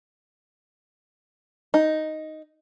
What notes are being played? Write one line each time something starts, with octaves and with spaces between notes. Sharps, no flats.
D#4